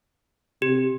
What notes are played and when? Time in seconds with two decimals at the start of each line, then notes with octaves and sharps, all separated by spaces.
0.62 C3 G4